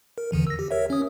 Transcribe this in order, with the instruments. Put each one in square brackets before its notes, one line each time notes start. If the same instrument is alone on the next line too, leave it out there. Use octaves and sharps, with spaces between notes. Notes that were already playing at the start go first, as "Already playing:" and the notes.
[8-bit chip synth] A#4
E2 D3 E3
E6 A#6
G4
A#4 C#5 E5
C#4 D#6